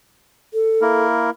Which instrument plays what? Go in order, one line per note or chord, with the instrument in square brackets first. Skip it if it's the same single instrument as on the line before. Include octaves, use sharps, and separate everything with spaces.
[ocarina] A4
[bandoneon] A#3 E4 A#4